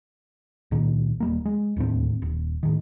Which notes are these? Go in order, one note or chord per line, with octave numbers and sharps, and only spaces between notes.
C#2 A#2 D#3
D#1 G3 A#3
G#3
D1 D#2 A2 C4
D#1
A2 D#3